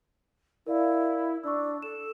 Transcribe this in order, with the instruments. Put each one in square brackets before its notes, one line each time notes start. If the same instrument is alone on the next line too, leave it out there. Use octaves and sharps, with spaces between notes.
[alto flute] E4 [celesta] A#4 D5 F5
[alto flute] D4 [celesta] C#6 E6
[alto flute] A4 [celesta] E7